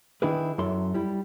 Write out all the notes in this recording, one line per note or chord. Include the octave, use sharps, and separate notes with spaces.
D#3 D4 E4 G#4 B4
F#2 E4 A4 C6
G3 E4